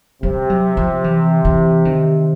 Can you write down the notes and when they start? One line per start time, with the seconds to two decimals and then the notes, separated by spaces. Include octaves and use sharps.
0.23 C3 G3
0.50 F#3
0.77 F3
1.04 E3
1.45 E3
1.85 D#3